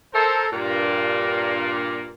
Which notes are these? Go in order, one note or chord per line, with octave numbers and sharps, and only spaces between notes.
A4 A#4 C5
G2 A#2 A#3